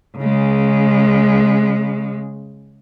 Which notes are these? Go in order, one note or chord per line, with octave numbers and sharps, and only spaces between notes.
C#3 G#3